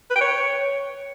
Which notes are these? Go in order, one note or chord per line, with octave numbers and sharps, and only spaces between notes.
B4
G5
C#5